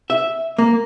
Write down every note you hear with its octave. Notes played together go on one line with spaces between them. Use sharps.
E5
A#3